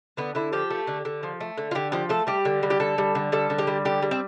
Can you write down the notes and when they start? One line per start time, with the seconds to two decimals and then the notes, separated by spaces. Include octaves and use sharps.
0.17 D3 B3
0.35 D3 E4
0.53 F3 G4
0.70 A3
0.87 D3
1.05 D3
1.23 F3
1.40 A3
1.57 D3
1.71 F4
1.75 D3 G4
1.92 F3 G4
2.09 A3 A4
2.27 G3 G4
2.45 D3
2.63 G3
2.70 G4
2.80 D3 A4
2.98 G3
3.15 D3
3.32 G3 A4
3.50 D3
3.58 G4
3.67 G3
3.85 D3 G4
4.02 G3
4.11 C4